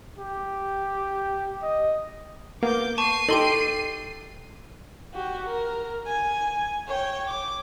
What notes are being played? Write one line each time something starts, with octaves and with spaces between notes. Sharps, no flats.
G4
D#5
A#3 B3 D6 G6
A5 C#6 C7 D#7
D#4 G4 A4 C6 D7 F#7
F#4 G4
A#4
G#5
C#5 G5
D6